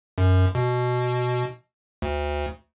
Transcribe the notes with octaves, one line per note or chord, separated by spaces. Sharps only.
F#2
B2
D2